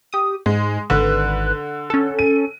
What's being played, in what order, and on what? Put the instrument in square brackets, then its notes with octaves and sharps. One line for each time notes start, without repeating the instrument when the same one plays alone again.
[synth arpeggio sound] G4 D#6
[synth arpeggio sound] G#2 [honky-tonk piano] G#3
[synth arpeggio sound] G#1 B4 F#6 [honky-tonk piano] D3
[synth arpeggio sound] C#4 A4
[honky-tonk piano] D#7